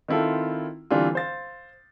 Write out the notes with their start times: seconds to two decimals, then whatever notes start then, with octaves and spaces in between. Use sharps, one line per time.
0.08 D#3 C4 E4 F4 A4
0.91 D3 E3 G3 C4 D4 F4
1.15 C5 F5 A6